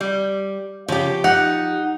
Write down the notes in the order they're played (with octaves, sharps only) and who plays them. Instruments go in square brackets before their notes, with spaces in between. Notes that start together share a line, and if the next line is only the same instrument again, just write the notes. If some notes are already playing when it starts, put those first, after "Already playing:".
[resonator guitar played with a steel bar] G3
[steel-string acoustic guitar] C#3 [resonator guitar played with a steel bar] F3 G4
[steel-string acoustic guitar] D#4 [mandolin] F#5